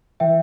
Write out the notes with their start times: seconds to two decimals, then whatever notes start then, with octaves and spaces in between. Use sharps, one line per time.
0.20 E3 E5 G5